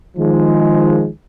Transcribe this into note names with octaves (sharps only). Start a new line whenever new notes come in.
D#3 F3 G#3